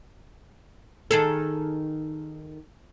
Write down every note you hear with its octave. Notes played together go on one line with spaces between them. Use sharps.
D#3 G#4 A4